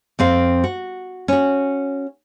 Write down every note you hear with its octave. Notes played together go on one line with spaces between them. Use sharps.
F2 C4 F5
F#4
C#4 F#4